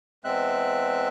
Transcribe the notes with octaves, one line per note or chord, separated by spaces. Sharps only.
E2 G#3 C4 E5 F#6